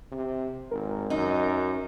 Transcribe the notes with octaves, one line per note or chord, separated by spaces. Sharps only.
C3
G#1 A#4
F#2 D#4